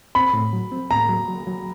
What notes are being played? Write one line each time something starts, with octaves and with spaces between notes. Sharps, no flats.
C4 B5
A2
F#3
C4
A2 A#5
F#3
F#3
F#3